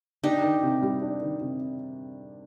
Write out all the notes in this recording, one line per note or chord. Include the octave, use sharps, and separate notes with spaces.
D4 D#4 G4
D#3
C3
G3
D4
D#3
C3